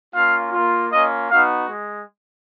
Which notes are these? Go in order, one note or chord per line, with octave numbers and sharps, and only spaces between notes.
A#3 C#4 F4 F5
A#3 F4
A#3 C#4 F4 D#5
B3 D#4 F#4 F5
G#3